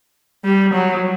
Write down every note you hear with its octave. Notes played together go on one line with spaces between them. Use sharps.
G3
F#3